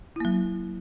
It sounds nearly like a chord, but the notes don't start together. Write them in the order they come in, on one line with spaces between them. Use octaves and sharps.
E4 A#3 F#3